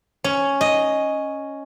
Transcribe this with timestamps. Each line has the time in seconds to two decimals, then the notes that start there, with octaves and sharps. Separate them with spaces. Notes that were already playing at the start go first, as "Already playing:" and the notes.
0.24 C#4
0.61 D#5